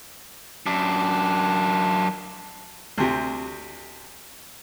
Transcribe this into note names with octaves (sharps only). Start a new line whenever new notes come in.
F#2 D4
D2 C3